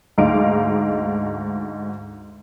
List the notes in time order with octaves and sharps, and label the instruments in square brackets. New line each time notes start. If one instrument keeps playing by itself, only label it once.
[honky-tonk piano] D2 G#2 D#4 F5 D6 D7